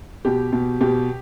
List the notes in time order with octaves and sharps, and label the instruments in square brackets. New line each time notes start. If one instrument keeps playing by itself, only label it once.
[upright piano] B2 G4
B2
B2 G4